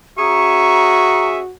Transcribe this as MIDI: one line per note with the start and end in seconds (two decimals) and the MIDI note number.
0.18 1.40 61
0.18 1.53 66
0.18 1.40 68
0.18 1.40 76
0.18 1.26 82
0.18 1.41 85